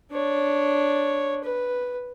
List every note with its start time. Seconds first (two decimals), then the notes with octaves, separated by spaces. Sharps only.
0.11 D4 C#5
1.44 B4